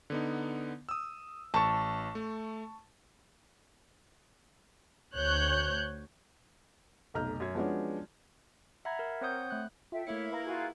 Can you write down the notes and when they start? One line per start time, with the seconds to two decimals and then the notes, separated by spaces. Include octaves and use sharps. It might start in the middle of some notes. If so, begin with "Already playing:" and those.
0.10 D3 B3 D#4
0.89 D#6 E6
1.54 A1 A5 C#6
2.15 A3
5.14 D2 C#5 F#6 G6
7.14 F1 B1 A#5 F6 G6
7.40 F#2 G#6
7.55 F3 F#3 G#3 B3 C#4 D4
8.85 E5 F#5 A#5 B5 G#6
8.99 A#4 A#5
9.21 C4 C5 C#5 F#5 D#6 G6
9.50 A3 F#6
9.92 F4 A4 E5 G5
10.07 A3 A#3 E4 C#5 E5 C#7
10.32 A#4 B4 F5 A#5
10.45 F4 F#4 G#4